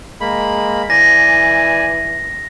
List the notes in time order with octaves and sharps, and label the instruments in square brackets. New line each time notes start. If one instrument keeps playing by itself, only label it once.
[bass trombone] G#3 [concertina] A#3 B5
[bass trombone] E3 [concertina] D5 G#5 [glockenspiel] A#6